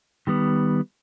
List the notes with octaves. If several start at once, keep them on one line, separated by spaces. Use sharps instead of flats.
D#3 G3 B3